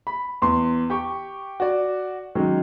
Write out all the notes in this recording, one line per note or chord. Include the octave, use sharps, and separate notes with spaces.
B5
E2 C6
G4 G5 C#6
F#4 D5
D#3 F#3 G#3 C#4